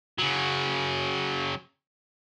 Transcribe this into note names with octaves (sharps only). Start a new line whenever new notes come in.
C#3 F#3